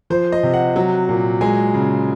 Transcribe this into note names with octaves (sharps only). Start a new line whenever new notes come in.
F3 C5
D#5
C3
F#5
F#3
A#2
G#3 G#5
C#3